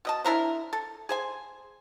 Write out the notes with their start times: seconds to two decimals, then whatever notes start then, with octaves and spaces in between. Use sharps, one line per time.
0.05 B2 D#5 A5
0.24 D4 E4 A#4 C5
0.73 A4
1.09 G#4 C5 G#5